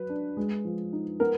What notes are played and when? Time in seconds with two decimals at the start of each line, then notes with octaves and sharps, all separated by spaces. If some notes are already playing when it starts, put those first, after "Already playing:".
Already playing: F#3 B4
0.09 D4
0.37 G#3
0.65 F3
0.93 D#4
1.20 B3 A#4